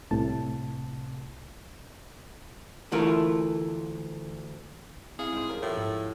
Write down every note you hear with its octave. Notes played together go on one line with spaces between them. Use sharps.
C2 A2 C3 A5
D2 E3 A3 E4 F4 A#4
C4 E4 G#4 F5
G#2 C5
F3 C#4 G4 A#4
A2 F3 F4
G#2 E4